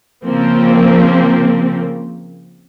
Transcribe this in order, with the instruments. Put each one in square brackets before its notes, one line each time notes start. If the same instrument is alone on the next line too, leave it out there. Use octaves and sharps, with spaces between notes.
[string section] C#3 F3 A#3 C4